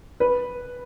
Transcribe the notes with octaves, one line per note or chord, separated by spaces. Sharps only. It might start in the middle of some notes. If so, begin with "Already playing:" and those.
B4